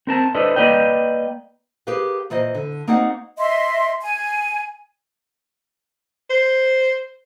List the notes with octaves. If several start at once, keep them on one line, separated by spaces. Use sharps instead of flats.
C4 A#4 A5
D4 E4 A4 B4 C5 D#5
A#3 B4 D5 D#5 G5
G4 G#4 A#4 B4 F5
A#2 E3 C5 D#5
D3
A#3 C4 D#4 F#4 D5 F#5
D#5 E5 C6
G#5
C5